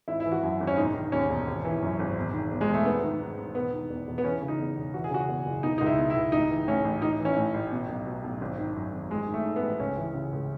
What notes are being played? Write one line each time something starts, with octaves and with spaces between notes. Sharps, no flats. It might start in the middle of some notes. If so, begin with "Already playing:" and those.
G#1 E4
E4
E3
F#4
F#2
G#1
C#4
E1 D#4
D#3
D#2 C#4
E1
G#1
E3
F#2
G#1
E1
D#3
E2
G#3
E1 A3
G#1 B3
D#3
G#2
G#1
E1 B3
D#3
E2
E1
B3
E3 C#4
C#3
D#4
E2
E1
E3 F#4
G#4
C#3 F#4
E2
F#1
B2 D#4
C#2 D#4
E4
B2
E4
C#2
A1 D#4
E3
A2 C#4
A1
A1 D#4
E3
C#4
A2
A1
B2
B1
B2
B1
G#1
D#3
F#2
G#1
A1 G#3
D#3
A3
G#2
B3
A1
C#2 C#4
E3
C#3
C#2